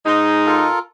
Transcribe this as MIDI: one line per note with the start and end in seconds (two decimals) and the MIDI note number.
0.06 0.66 44
0.06 0.66 56
0.06 0.66 63
0.46 0.79 65
0.46 0.79 69
0.46 0.79 70